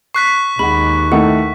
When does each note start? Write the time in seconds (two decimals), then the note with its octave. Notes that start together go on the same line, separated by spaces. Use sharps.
0.14 C#6 F#6 B6 C7
0.59 D#2 G#3 F#5 B5
1.12 D#3 A3 E4 F#5